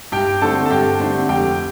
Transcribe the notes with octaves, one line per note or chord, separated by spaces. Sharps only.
G2 G4 G5
D3 A3 C4 A4 A5
A5
G2 G4 G5
D3 A3 C4
F1 G4 G5